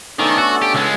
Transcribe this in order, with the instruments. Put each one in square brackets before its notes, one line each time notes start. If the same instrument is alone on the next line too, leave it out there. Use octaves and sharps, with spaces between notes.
[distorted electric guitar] D#3 [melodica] A3 C#4 D5 [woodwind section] B3 D4 A4
[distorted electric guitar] F#4
G4
C#2 G#3